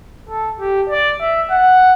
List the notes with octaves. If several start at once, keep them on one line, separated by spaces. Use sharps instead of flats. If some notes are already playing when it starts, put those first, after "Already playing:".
A4
G4
D5
E5
F#5